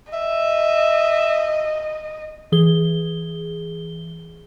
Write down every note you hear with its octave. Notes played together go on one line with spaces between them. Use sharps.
D#5 E5
E3 G#4 G7